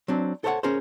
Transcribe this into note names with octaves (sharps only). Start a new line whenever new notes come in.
F#3 C4 D4
A4 C5 C#5 E5 F#5
C#4 G#4 A#4 C5